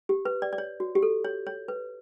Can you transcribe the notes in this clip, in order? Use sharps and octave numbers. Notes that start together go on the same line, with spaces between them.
G4
B4
D5
D5
C#5
F#4
G4
A4
C#5
C#5
B4